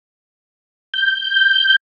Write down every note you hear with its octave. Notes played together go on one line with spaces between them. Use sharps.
G6